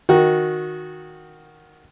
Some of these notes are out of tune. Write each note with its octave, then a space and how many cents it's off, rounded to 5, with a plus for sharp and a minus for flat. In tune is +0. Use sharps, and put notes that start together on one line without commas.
D#3 +0 F#4 -15